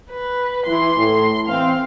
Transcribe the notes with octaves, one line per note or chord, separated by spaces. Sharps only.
B4
E3 C6
A2
E3 C4 F5